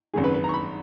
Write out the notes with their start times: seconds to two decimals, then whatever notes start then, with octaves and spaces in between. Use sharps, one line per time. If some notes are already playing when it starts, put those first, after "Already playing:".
0.14 G#1 F#2 C#3 G#4
0.24 B4
0.34 B4
0.44 A#5
0.49 C#6
0.54 B5